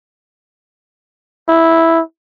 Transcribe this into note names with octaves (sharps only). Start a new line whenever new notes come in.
E4